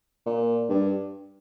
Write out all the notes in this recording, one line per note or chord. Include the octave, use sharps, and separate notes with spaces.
A#2
G2